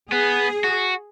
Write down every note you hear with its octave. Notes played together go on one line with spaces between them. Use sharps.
B3 G#4
F#4